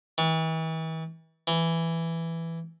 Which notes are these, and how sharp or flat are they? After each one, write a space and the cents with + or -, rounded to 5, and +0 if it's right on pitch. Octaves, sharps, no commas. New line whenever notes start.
E3 -40
E3 +5